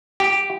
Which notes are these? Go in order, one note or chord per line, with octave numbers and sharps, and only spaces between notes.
G4